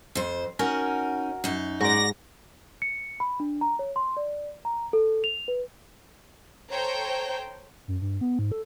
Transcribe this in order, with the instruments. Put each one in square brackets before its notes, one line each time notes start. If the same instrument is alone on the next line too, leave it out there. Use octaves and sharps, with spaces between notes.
[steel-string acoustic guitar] F2 C5
[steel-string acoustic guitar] C#4 D#4 [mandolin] F#4 A#4 G#5
[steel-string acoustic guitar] F#2 D#4
[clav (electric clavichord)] G#2 [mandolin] F#4 D5 [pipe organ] A#6
[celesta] C#7
B5
D4
A#5
C#5
C6
D5
A#5
A4
F7
B4
[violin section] A4 C5 C#5 G5 A#5
[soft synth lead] F#2
G2
B3
G#2
A4